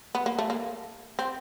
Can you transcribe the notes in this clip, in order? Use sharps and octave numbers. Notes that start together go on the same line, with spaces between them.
B3
A#3
A3
A#3
C4